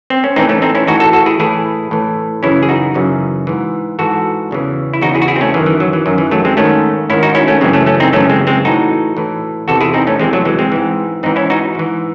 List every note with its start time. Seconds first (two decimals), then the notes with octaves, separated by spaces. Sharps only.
0.10 C4
0.24 C#4
0.36 A2 E3 C4 D#4
0.49 A3 C#4
0.62 C4 D#4
0.75 C#4 E4
0.87 A2 E3 D#4 F#4
1.00 F#4 A4
1.13 F#4 A4
1.26 E4 G#4
1.40 A2 E3 E4 G#4
1.91 A2 E3
2.43 F#2 C#3 E3 C#4 E4
2.63 G#4
2.69 D#4 F#4
2.94 F#2 C#3 E3
3.47 G#2 E3
3.99 G#2 E3 F#4 A4
4.51 E2 C#3 E3
4.94 E4
5.02 E2 C#3 E3 D#4 F#4
5.15 E4 G#4
5.22 F#4
5.28 E4 G#4
5.36 C4
5.41 A3 C#4
5.54 F#2 D#3 E3
5.66 E3
5.80 F#3
5.93 E3
6.06 F#2 D#3 F#3
6.18 E3
6.31 F#3 A3
6.45 G#3 C4
6.57 G#2 D#3 A3 C#4
7.10 G#2 D#3 C#4 E4
7.23 D#4 F#4
7.35 C#4 E4
7.48 A3 C#4
7.61 F#2 C#3 E3 G#3 C4
7.73 A3 C#4
7.86 A3 C#4
8.00 C4 D#4
8.13 F#2 C#3 E3 A3 C#4
8.30 G#3 C4
8.47 G#3 C4
8.65 A2 E3 D#4 F#4
9.17 A2 E3
9.68 E2 C3 E3 F#4 A4
9.81 E4 G#4
9.94 C4 D#4
10.07 A3 C#4
10.20 E2 C3 E3 G#3 C4
10.33 F#3 A3
10.45 E3 G#3
10.59 G#3 C4
10.72 G#2 E3
11.23 G#2 E3 C4 D#4
11.36 C#4 E4
11.50 D#4 F#4
11.75 G#2 E3